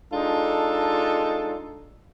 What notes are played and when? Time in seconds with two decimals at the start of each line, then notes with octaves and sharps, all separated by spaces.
0.12 G#3 D4 D#4 F4 A4